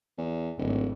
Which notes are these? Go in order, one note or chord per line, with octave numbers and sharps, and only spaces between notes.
E2
D1 G#1